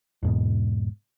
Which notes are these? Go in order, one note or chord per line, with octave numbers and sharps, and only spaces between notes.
E2 G#2 B2